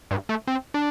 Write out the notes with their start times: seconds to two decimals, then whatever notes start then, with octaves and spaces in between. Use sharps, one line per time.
0.11 G2
0.29 A3
0.47 C4
0.74 D4